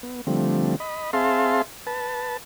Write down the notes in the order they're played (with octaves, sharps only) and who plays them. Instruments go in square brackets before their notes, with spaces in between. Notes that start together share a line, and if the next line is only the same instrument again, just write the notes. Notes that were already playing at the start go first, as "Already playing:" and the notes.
[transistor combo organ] B3
D3 F3 G3 A3 C4
D#5 B5
C4 G#4 E5 F5 A5 C6
B4 A5